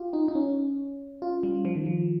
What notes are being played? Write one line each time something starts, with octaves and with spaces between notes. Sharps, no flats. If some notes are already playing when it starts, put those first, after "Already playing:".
Already playing: F4 G4
D#4
D#4
C#4
F4
G3
F3
D#3
F3